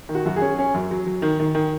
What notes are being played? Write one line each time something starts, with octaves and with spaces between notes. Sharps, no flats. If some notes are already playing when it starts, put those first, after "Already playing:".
D#3
F#4
F#2 F#4
G#4
C#4
C#4
F#2
F#3
F#3
D#3
D#3
D#3